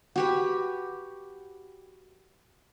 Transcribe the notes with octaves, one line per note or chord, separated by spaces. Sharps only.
F#4 G4 B4